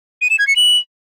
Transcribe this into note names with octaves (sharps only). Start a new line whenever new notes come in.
D#7
E7
G#6
C#7
F#7